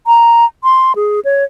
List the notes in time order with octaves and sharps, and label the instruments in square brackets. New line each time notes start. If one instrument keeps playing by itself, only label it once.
[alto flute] A#5
C6
G#4
C#5